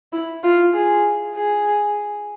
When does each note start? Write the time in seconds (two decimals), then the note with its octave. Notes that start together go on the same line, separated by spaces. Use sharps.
0.13 E4
0.43 F4
0.74 G#4
1.35 G#4